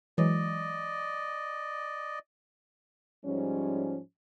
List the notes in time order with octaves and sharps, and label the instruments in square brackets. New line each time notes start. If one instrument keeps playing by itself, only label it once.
[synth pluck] E3 F#3 G#3 [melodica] D5 D#5
[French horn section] G#2 F3 G3 C#4